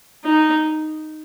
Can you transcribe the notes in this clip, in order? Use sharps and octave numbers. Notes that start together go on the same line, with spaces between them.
D#4